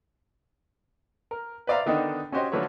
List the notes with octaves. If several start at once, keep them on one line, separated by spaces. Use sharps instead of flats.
A#4
B4 C5 D5 E5 F5 A#5
D3 D#3 B3 D4 D#4
C#4 F#4 G4 C5 C#5 D#5
D3 F3 F#3 A3 B4 C#5